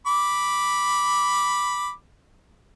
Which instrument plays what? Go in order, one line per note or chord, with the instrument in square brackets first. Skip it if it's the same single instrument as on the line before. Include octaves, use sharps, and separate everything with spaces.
[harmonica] B5 D6